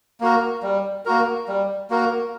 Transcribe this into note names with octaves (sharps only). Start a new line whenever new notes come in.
A#3 F#4 A#4
G3
A#3 F#4 A#4
G3
A#3 F#4 A#4